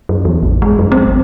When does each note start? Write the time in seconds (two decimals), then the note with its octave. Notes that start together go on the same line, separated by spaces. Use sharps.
0.09 F#2
0.25 E2
0.43 A1
0.62 G#3
0.79 F#2
0.92 C4
1.06 G#1